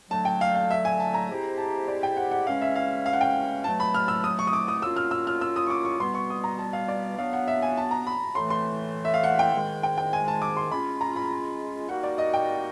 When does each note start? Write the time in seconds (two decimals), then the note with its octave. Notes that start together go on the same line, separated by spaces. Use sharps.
0.11 D3 F#3 A3 A5
0.25 G5
0.41 F5
0.55 F5
0.70 E5
0.85 G#5
1.00 A5
1.14 A#5
1.28 G#3 C4 E4 G4 C5
1.58 A5
1.88 D5
2.03 G5
2.17 F#5
2.31 F#5
2.46 C#3 E3 G#3 C#4 F5
2.62 E5
2.76 F5
3.06 F5
3.13 F#5
3.21 G5
3.64 B2 F#3 A3 A5
3.80 B5
3.95 F6
4.08 E6
4.24 D#6
4.39 C#6
4.47 D#6
4.53 D6
4.68 D#6
4.82 F#3 A#3 C#4 F4 E6
4.96 F6
5.11 E6
5.27 F6
5.41 E6
5.56 D#6
5.67 C#6
5.70 D6
5.85 C#6
6.00 B2 G3 B3 C6
6.14 C#6
6.30 D#6
6.44 A#5
6.59 A5
6.73 F5
6.88 D5
7.18 F#3 B3 D4 F5
7.33 F#5
7.48 E5
7.62 G#5
7.77 A5
7.91 A#5
8.07 B5
8.35 A2 E3 A3 C6
8.50 C6
9.05 E5
9.14 F5
9.24 F#5
9.39 G5
9.53 G#2 D#3 G#3
9.83 G5
9.98 G5
10.13 G#5
10.28 A5
10.42 D6
10.57 C6
10.71 G#3 C#4 F4 B5
11.01 A#5
11.16 B5
11.89 G3 A#3 D#4 F#4 F#5
12.03 D5
12.18 D#5
12.34 G5